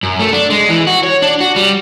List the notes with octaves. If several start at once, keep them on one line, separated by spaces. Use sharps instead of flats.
F#2
A3
D4
G#3
E3
F#4
C#5
D4
F#4
G3